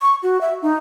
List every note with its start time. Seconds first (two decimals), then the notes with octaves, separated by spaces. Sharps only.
0.02 C#6
0.23 F#4
0.41 E5
0.62 D#4